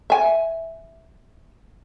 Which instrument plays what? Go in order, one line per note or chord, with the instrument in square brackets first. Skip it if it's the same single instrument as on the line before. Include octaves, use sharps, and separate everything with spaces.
[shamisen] E5 G#5